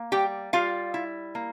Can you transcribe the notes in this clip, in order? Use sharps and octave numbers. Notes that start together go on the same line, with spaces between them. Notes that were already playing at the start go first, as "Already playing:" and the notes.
Already playing: A#3
G3 G4 G5
G3 F4 F5
E4
A#3